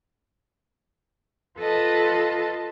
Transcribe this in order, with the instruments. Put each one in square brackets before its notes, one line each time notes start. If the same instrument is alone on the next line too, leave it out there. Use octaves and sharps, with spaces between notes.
[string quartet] F4 A4 B4 D#5 A5